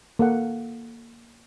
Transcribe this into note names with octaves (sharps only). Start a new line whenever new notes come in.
A#3 A4 F#5